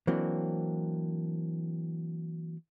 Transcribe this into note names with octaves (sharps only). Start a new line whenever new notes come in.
E3 F#3 A#3 C4 D4